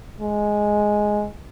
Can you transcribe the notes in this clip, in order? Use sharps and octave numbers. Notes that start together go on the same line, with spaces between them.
G#3